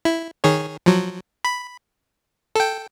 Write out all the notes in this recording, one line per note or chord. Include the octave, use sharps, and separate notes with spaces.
E4
D#3 G#4 C#5
F3 F#3
B5
A4 G5